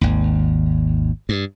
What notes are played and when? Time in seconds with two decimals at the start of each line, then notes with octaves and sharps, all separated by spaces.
0.01 G#1 D#2
1.29 G2